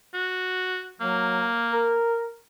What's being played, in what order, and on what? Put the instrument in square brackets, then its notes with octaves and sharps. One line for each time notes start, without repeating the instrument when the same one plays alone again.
[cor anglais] F#4
[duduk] F#3 [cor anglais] A#3
[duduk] A#4